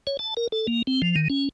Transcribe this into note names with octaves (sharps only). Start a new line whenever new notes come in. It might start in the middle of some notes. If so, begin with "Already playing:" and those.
C#5
A5
A#4
A4
A#3
C4
F3
D#3
C#4